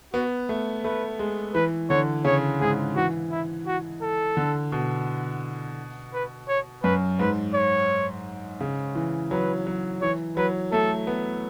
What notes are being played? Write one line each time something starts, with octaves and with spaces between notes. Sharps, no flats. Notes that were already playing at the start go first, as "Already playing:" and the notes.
B3 F#4
A3
A3 B4
G#3
E3 B4
D3 C#5
C#3 C#5
G#2 G#4
E3 F#4
E4
F#4
A4
D3
B2
B4
C#5
F#2 B4
G#2 B4
C#5
C#3
E3
F#3 B4
F#3
E3 C#5
F#3 B4
A3 A4
B3